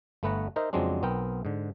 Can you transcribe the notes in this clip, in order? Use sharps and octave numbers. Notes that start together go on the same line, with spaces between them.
G1 A3 B3 B4 F#5 A#5
D#4 A#4 C5 D#5 E5
F2 C#3 F#3 G#3 C4 D4
B1 B3 C4 A#4 G5
G#2 D3